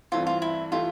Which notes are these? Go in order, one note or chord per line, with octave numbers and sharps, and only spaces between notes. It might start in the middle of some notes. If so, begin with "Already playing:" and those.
G2 E3 A3 C4 F4
F4
E4
E3 A3 E4 F4 G4